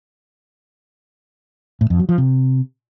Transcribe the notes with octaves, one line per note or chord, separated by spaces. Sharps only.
A2
F2
F#3
F3
C3